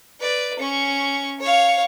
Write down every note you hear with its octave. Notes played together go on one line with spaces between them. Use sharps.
B4 D5
C#4 C#6
C#5 F5